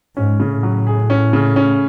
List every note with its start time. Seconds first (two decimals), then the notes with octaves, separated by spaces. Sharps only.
0.17 G#2 C#4
0.40 C#3
0.52 A2
0.63 F#3
0.87 G#4
1.10 C#4
1.33 C#3
1.56 C#4